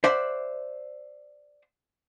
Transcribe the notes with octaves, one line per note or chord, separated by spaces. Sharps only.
C5 D5 E5 F#5